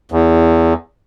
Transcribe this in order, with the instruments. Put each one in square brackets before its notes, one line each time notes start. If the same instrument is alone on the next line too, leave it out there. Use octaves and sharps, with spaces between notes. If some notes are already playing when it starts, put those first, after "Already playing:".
[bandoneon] E2